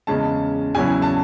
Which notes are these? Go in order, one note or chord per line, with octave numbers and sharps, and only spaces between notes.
E2 C#3 G#3 C#4 A5
E2 C#3 F#3 C#4 E4 G#5
A5